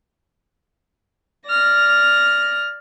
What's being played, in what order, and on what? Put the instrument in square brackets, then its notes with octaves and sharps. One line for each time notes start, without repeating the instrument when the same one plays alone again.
[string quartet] D5 F6 A#6